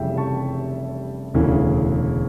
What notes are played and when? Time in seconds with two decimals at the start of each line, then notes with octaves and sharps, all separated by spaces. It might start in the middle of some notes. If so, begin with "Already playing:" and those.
Already playing: F1 F2 C#3 E3 G3 E5 G5
0.17 A5 C#6
1.34 E1 D2 C#3 E3